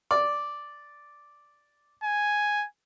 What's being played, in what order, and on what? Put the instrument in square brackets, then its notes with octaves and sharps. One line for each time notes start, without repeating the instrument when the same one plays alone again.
[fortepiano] D5
[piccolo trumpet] G#5